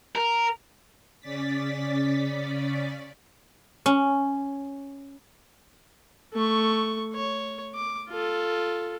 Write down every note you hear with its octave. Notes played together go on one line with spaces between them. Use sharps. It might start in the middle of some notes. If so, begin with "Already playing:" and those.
A#4
C#3 C#4 D5 A6 B6
C#4
A3 C#6
C#5
D6
F4 A4